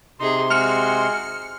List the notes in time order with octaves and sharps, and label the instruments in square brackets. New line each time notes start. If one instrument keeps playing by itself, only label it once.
[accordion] C3 C6 [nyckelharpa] D#4 G#4
[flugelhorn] G#3 [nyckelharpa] C4 F#4 [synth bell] F6 C#7